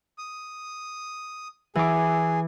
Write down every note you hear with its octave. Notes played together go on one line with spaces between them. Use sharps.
D#6
E3 G#4 D6